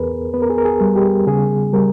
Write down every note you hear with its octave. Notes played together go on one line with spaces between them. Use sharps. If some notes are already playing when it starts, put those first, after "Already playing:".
Already playing: E2 B3 G#4 A#4 B4
B3 B4
A#4
G#4
A#4
G#4
G3
G4
C#3 G#4
G3 A#4